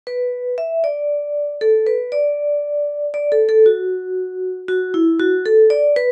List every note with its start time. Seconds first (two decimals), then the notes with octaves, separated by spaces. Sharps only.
0.07 B4
0.58 E5
0.84 D5
1.61 A4
1.87 B4
2.12 D5
3.14 D5
3.32 A4
3.49 A4
3.66 F#4
4.68 F#4
4.94 E4
5.20 F#4
5.46 A4
5.70 D5
5.96 B4